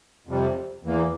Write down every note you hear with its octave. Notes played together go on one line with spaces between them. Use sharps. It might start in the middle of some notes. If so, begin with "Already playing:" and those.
F2 C3 G3
E2 E3 A#3